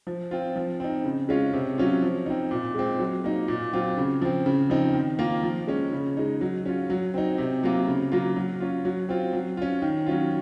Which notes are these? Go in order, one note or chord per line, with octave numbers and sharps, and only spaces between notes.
F3
C4 F4
F3
C4 D#4
C#3
G#3 C#4 F4
C3
F#3 C#4 F4
F3
C4 D#4
A#2
G#3 C4
F#3
A#3 D#4
A#2
F#3 C4 F4
C#3
F3 C4
C#3
F3 C4 D#4
D#3
A#3 F4
F3
G#3 C#4
C#3
G#3 D#4
F#3
C#4 F4
F#3
C4 D#4
C3
F#3 A#3 F4
C#3
F#3 A#3 F4
F#3
C#4 F4
F#3
C4 F4
F#3
C#4 F4
D#3
F#3 C#4 F4